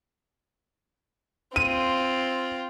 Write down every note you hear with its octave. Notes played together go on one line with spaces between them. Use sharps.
C4 F4 D#7